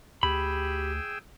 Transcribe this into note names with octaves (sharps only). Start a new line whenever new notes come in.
D2 G4 G#4 G5 B5 E6